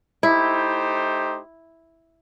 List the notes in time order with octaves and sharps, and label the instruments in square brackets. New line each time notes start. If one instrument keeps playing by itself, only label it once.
[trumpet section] A3 D#4 G4 C5 [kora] E4